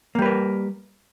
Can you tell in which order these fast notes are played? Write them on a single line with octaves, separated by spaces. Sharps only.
A#3 G3 B4 A#4